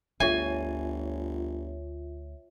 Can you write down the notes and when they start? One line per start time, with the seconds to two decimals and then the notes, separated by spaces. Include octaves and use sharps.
0.20 G1 D2 F4 C#5 E5 G#5